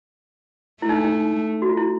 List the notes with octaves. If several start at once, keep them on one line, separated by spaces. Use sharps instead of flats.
A3 E4
D#4
D4
D#4
F#4
F4
E4